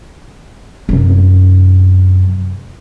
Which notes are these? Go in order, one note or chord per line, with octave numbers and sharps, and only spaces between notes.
F#2 C3